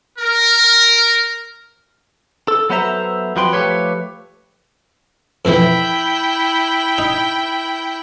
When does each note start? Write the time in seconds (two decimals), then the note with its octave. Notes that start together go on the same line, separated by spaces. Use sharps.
0.19 A#4
2.48 A4
2.70 F#3 B3 A4 C5 E5 A#5
3.36 F2 F3 F#3 B4 G5 C6
3.53 F3 A3 G4 B4 C#5
5.45 F2 B2 E3 E4 G5
6.98 D#4